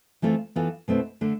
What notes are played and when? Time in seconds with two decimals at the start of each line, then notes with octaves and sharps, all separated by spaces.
0.22 E3 A3 C4 F4 A4
0.56 E3 B3 F4 A4
0.88 B2 A3 C4 E4
1.21 D3 A3 D4